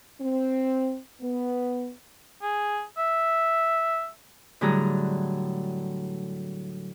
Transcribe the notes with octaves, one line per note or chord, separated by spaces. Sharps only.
C4
B3
G#4
E5
A2 D3 F#3 G3 G#4 A#5